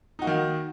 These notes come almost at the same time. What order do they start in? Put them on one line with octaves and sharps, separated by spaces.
D#4 F#4 A#3 D#3